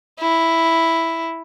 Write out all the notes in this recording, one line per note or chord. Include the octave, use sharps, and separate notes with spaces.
E4